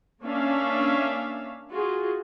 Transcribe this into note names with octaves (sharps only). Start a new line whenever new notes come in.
A#3 C#4 D4 C#5 E5 F5
F4 F#4 G#4